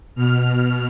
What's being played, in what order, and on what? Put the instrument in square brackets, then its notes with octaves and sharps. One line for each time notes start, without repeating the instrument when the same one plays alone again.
[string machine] B2 F6